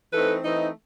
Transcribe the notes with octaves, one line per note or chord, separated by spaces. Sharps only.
E3 A3 C4 D#4 A4 B4
E3 A3 C4 D#4